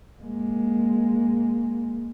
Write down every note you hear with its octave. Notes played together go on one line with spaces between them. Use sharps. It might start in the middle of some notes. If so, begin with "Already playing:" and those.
G#3 A#3